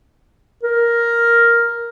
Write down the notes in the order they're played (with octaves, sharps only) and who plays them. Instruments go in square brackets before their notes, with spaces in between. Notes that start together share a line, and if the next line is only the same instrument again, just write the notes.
[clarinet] A#4